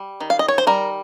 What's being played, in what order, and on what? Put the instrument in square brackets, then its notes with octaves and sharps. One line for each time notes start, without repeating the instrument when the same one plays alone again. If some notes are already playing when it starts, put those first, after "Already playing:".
Already playing: [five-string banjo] G3
D#3
F5
D#5
C#5
C5
G3 A#4